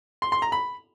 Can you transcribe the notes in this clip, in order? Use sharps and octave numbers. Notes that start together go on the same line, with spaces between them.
C6
C6
A#5
B5